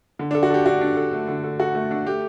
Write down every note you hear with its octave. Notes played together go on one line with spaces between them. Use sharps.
D3
D4
A4
F#4
G4 A4
D4 F#4
D4
A4
A3
D3
A4
F#4 A4
A3
D4
A3 G4